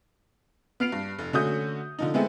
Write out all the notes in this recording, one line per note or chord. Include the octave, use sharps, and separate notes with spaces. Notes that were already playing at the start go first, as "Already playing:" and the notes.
B3 F6 C7 D7 F7
G2
F1
D3 A3 C#4 F#4 D#6 G6
D3 F3 D#4
G#3 A3 B3 C4 E4 G#4